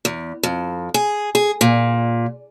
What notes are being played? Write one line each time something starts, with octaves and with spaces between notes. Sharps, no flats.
E2
F2
G#4
G#4
A#2